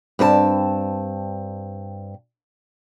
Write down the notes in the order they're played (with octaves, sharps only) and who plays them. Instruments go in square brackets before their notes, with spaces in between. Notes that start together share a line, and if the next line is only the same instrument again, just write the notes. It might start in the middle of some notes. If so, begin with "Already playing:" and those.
[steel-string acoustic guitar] G2 C4 A#4 A5